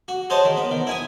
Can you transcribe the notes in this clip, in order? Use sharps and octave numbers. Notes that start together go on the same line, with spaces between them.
F#4
G#4 C5 C#5 D#5 A5
D#3
B3
D#3
E4 G#5 D#6